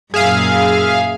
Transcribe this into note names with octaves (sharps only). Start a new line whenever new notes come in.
F#2 A#2 G#4 E5 F5